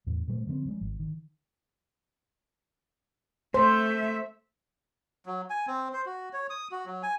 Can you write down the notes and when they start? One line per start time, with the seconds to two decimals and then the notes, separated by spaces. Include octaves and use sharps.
0.07 E2 A2
0.28 A#2 G3 A3
0.47 D3 F3 B3 C4
0.66 F3 G#3
0.81 G#1
0.99 D#3
3.54 A3 C5 E5
5.26 F#3
5.50 G#5
5.67 C4
5.93 C5
6.06 F#4
6.33 C#5
6.50 D#6
6.71 F#4
6.86 F#3
7.03 G#5